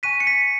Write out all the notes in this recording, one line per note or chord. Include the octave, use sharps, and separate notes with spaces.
G#5 C#6 F#6 B6 D#7
C#7
B6 D#7